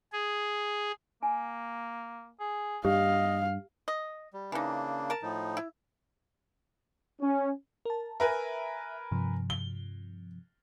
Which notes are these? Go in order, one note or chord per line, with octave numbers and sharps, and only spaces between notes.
G#4
A#3 G#5
G#4
G2 G4 D#5 F5
D#5
G3
C#3 E3 A#3 D4 D#4
A#4 A5
A2 F3 D#4
E4
C#4
A#4 A5
A#4 B4 E5 G#5
G2 C3 F3
G7